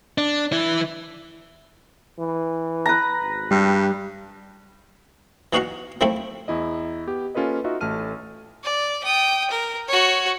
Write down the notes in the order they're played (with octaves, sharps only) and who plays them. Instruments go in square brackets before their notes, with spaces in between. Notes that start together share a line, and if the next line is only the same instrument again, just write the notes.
[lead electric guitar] D4
E3 E4
[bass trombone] E3
[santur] B4 A#5
[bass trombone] G#1
[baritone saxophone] G2 [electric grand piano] G3
[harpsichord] E3 D#4 F#4 F5 F#5 A#5
D#3 F3 A3 C4 E4
[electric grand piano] E2 E4 D#5
B3 G4
A#3 C#4 F4 A4 B4 D#5
D#4 F4 F#4 D#5 E5
A1 A3 A5 F6 D#7
[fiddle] D5
G5 D#6
A#4
F#4 C#5